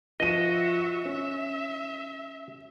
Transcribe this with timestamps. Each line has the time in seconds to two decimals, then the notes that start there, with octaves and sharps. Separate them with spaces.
0.20 F3 F#4 D#5 E5 D#7
1.05 C#4 E5